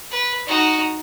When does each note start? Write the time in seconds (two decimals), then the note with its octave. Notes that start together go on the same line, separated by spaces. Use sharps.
0.11 B4
0.47 D#4 F#4